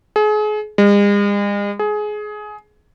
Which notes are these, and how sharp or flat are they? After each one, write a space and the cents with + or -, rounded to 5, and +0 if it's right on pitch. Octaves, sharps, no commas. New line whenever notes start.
G#4 +35
G#3 -40
G#4 +20